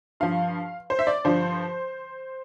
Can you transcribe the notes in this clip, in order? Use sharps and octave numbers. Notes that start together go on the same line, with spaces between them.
G2 F3 F5
C5
E5
D5
G2 D3 F3 C5